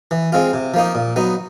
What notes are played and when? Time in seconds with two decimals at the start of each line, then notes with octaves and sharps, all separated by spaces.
0.11 E3
0.32 G#3 C4 F4
0.53 C3
0.74 F3 A#3 D#4
0.95 A#2
1.16 F#3 B3 D#4